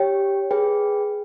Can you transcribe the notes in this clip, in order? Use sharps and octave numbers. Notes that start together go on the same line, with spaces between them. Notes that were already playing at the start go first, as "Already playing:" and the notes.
Already playing: G4 C#5 G5
G#4 B4 G5